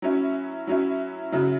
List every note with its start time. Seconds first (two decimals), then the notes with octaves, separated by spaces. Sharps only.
0.02 F#3 C#4 E4
0.67 F#3 C#4 E4
1.32 C#3 F#3 E4